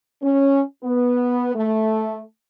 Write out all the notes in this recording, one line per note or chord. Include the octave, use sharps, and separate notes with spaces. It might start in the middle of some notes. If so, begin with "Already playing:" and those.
C#4
B3
A3